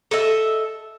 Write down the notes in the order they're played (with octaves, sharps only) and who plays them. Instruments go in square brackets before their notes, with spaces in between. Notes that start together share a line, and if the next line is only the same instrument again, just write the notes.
[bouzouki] A4 D#5 E5